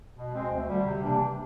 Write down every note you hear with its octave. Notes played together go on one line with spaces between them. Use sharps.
B2
G#3 C4
D2
D3 G3
C3
E3 G3 A#3 D4
C3